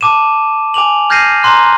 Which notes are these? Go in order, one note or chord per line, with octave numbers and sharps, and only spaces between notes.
A5 D6 D#7 E7
G#5 D6 F7 F#7
F6 G6 G#6 A#6 C7 D#7
A#5 C6 F#6